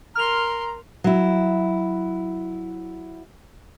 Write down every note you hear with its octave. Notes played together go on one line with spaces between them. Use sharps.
A#4 A#5 C6 F6 F7
F#3 E4